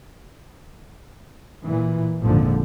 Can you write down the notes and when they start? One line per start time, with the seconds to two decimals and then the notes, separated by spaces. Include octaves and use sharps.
1.66 A#2 E3
2.22 G#1 F2 A#2 D3 F3